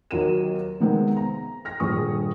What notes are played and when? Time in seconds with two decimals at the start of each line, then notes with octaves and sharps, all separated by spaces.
0.11 D#2 F#3 A#4 D#7 E7
0.80 C3 D#3 G#3 B3 C4
1.17 A#5
1.65 F6 A#6
1.80 D#1 G2 G#4 C#6 D#6